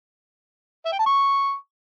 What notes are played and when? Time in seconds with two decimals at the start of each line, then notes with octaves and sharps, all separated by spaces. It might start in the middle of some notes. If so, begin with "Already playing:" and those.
0.85 E5
0.92 G5
0.99 A5
1.06 C#6